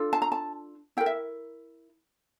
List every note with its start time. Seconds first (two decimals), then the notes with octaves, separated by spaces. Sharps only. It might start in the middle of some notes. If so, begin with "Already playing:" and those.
Already playing: D4 F4 A4
0.13 A5
0.22 A#5
0.32 A5
0.97 E4 G5
1.00 A#4
1.06 E5